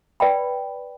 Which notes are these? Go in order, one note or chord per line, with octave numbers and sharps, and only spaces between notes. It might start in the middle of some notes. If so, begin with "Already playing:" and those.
B4 D5 G5 B5